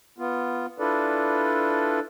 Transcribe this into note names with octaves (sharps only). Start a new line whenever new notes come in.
B3 F4
D4 E4 F4 A4 B4 D5